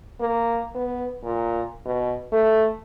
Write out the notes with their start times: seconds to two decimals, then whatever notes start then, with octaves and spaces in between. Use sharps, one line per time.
0.20 A#3
0.75 B3
1.24 A#2
1.85 B2
2.32 A3